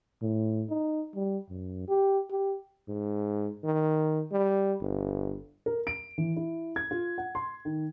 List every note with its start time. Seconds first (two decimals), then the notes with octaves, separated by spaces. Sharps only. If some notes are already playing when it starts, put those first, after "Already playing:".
0.22 A2
0.70 D#4
1.15 G3
1.50 F#2
1.88 G4
2.30 G4
2.88 G#2
3.64 D#3
4.32 G3
4.81 G1
5.66 A#4
5.87 D7
6.18 E3
6.36 E4
6.76 G#6
6.91 F4
7.18 F#5
7.35 C6
7.65 D#3